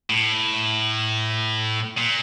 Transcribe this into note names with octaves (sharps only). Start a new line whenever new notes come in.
A2
A#2